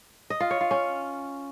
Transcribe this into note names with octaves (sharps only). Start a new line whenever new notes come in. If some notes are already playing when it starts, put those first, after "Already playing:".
D#5
F4
C#5
F4
C#4